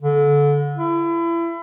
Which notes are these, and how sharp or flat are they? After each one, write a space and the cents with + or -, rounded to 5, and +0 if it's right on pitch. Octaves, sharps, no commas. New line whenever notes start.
D3 -25
E4 +30